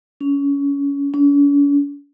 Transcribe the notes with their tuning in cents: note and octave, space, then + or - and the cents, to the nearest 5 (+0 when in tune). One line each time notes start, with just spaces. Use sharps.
C#4 +25
C#4 +45